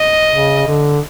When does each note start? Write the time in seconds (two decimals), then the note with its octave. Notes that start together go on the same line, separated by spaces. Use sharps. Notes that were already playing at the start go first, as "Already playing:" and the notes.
Already playing: D#5
0.30 C#3
0.67 D3